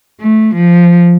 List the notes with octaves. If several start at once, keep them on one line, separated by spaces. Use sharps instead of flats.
A3
F3